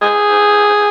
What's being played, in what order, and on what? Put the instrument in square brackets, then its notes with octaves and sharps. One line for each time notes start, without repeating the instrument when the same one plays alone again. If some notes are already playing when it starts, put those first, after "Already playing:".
[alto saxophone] G#4